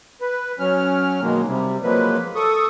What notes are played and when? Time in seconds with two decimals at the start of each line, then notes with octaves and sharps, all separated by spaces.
0.21 B4
0.59 F#3 C#4 F6
1.22 B2 D#3 F#3 G#3 A#3
1.47 C3 G3
1.83 F3 F#3 G#3 A#3 B4
2.35 A4 C#6 D#6